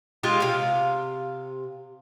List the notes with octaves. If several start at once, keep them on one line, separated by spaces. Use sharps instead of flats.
G#3 F4 G4
C3 F5